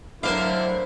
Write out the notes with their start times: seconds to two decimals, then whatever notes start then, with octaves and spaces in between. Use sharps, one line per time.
0.23 D3 F#3 E4 A#4 C5 F5 C6 D6